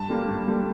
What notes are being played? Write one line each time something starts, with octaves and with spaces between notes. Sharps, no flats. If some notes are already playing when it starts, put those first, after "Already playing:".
Already playing: G2 A5
D3 G3 A#3
G2
D3 G3 A#3